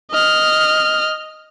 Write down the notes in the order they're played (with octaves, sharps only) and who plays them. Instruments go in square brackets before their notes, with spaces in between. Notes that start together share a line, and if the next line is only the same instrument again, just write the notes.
[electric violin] D#5 F6